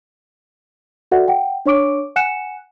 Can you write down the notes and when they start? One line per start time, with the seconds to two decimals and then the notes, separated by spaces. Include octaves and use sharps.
1.11 F#4 A4 B4 D5 E5 F#5
1.28 F#5 G5
1.66 D4 C#5 C#6 D6 D7
2.16 F#5 G#5 F#6 C#7 E7